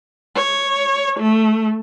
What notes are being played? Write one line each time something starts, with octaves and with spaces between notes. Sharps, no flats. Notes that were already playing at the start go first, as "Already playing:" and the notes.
C#5
A3